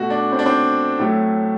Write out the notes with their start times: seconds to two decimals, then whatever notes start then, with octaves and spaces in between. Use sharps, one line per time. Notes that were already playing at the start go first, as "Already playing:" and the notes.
Already playing: B2 A3 F#4
0.10 D4
0.32 C4
0.39 D4
0.46 C4
0.99 A2 F#3 A3